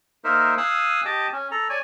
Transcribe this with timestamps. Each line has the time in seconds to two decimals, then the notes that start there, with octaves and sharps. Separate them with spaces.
0.24 A#3 D#4 A#4 C5 E5
0.58 F5 G#5 D#6 E6 F#6
1.05 G4 D#5 A5 D6
1.33 C#4
1.51 A4 A#5
1.70 C#5 D5 G#5